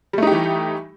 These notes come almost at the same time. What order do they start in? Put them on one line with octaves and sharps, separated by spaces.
G3 A3 D#4 G4 E3